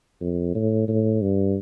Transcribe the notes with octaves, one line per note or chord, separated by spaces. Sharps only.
F2
A2
A2
G2